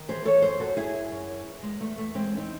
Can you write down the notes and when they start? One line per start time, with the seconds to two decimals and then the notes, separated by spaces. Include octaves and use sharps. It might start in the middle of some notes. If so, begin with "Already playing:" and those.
Already playing: D#3
0.09 E3 G#4 C5
0.25 A4 C#5
0.42 F#2 G#4 C5
0.60 F#4 A4
0.77 F#2 E4 G#4
1.11 F#2
1.47 E2
1.63 G#3
1.80 E2 A3
1.98 A3
2.14 E3 G#3 C4
2.37 C4 D#4